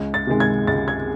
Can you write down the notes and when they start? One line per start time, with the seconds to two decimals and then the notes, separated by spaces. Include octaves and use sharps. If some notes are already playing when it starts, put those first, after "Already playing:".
Already playing: C#2
0.14 A6
0.27 C3 D#3 G#3
0.40 G#6
0.67 C#2 A6
0.88 G#6